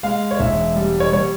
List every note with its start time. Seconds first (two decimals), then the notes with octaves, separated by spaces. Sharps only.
0.03 G#3 F5
0.31 C#5
0.39 E1 E5
0.76 G3
1.00 C#5
1.12 G3 C#5